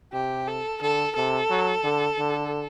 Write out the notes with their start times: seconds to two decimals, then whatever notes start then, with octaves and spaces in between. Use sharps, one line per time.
0.13 C3 G4
0.47 A4
0.81 D3 A4
1.16 C3 A4
1.50 F#3
1.84 D3
2.19 D3